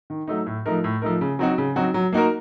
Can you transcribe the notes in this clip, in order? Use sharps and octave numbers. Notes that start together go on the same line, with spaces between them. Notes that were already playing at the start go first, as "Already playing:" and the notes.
D#3
F#3 A3 D#4
A2
F3 A3 D#4 A#4
A2
F3 A3 D#4 A#4
C#3
F#3 C4 D#4 F#4
C#3
F#3 C4 D#4 F#4
F#3
A#3 D#4 F#4 A#4